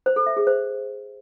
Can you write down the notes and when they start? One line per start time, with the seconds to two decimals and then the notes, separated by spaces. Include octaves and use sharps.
0.06 C5
0.16 A4
0.26 E5
0.37 G#4
0.47 C5